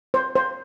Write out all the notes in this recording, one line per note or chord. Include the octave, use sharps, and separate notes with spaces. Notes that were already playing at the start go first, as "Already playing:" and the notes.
C5
C5